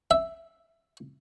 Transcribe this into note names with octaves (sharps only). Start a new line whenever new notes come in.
E5